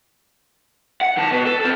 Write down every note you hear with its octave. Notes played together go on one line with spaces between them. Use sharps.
F#5
D#3 A5
B2 B4
A4
C4 A4